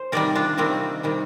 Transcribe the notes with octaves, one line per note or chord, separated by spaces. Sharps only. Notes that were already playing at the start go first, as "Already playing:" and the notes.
Already playing: C5
C3 D#3 G3 A#4 D5
D4 F4
C3 D#3 G3 C4
C3 D#3 G3